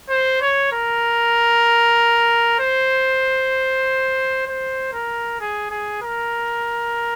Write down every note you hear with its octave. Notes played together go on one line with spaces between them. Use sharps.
C5
C#5
A#4
C5
C5
A#4
G#4
G#4
A#4